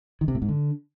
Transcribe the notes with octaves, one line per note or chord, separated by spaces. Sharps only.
D#3
C3
A2
G#2
D3